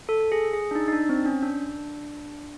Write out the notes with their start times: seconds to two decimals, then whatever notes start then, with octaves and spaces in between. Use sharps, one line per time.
0.09 A4
0.32 G#4
0.53 G#4
0.71 D4
0.75 D#4
0.88 D#4
0.93 D4
1.09 C4
1.26 C#4
1.43 D4